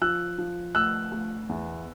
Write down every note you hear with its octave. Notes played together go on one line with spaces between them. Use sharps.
F3 E6 F#6
F3
A3 E6 F#6
A3
E2